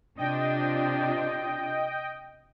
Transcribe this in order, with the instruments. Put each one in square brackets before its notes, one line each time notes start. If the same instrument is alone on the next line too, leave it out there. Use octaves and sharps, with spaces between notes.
[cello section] C3 D4 F4 [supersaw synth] D#5 G5